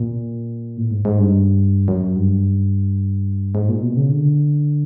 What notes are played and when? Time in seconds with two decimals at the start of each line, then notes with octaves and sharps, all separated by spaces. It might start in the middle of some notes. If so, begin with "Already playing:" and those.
Already playing: A#2
0.77 A2
0.91 G#2
1.05 G#2
1.19 G2
1.88 F#2
2.16 G2
3.55 G#2
3.69 A#2
3.82 B2
3.97 C#3
4.10 D3